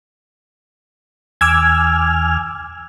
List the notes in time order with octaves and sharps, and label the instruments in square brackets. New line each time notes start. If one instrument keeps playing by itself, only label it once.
[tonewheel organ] E2 G#5 F6 [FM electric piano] D6 E6 G#6